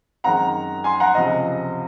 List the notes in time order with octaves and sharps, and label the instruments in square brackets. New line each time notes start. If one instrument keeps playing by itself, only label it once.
[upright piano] F#2 D#3 G#3 C4 F#5 A#5
G#5 C6
F#5 A#5
C#2 C3 F3 D#5